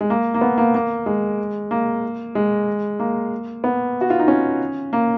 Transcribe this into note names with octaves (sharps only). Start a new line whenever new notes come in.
G#3
A#3
A#3
B3
A#3
A#3
G#3
A#3
G#3
A#3
B3
F#4
F4
D#4
C#4
A#3